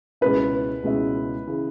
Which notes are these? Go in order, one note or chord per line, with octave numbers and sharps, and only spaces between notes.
C#2 B2 G#3 C#4 E4 B4
C#2 B2 G#3 C#4 E4
C#3 E3